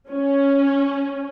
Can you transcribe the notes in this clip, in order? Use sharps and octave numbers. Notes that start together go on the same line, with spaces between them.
C#4